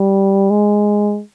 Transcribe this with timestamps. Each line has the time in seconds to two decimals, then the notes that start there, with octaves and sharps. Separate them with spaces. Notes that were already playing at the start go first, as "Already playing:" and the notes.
Already playing: G3
0.50 G#3